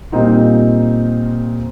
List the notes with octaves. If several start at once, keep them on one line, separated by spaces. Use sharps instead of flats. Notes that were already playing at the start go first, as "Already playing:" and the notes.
A#2 G3 C4 D#4 F4